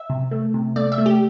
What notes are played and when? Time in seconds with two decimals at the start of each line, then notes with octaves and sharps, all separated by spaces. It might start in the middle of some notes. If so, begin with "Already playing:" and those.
Already playing: E5
0.10 C3
0.31 A3
0.54 C3
0.76 A3 D5
0.92 E5
0.98 A3
1.06 G4